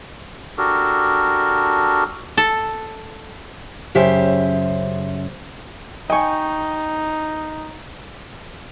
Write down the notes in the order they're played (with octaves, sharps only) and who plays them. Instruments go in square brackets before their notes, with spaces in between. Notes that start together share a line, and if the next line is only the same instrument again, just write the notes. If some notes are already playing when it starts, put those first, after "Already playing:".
[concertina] D4 F#4 G4 A4 A#4
[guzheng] A4
[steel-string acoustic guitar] F#2 C#3 G4 C5 E5
[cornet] D#4 [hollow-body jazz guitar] D#5 G#5 [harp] G5 C#6